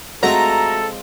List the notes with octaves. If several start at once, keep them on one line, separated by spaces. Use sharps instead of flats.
G#3 A3 C4 F4 F#4 A4 A#5